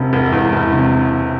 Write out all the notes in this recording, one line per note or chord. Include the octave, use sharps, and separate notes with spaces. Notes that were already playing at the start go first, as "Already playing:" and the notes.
Already playing: E1 C3
E1
E2
E1
C3